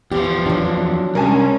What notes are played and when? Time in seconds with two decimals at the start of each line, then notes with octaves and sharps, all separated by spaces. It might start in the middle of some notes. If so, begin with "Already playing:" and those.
0.12 E2 F3 G4
0.46 F#3 D4
1.15 C2 G#3 C#4 A#4 G#5 A5